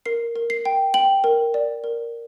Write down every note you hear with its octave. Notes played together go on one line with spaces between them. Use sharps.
A#4 C7
A#4
C7
G5
G5 F#7
A#4
D5
A#4